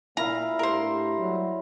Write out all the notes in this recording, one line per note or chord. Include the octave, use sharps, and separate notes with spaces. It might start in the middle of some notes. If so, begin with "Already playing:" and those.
A#2 E4 F5 A#5
A2 D4 G4 A#4 C5
F#3 G3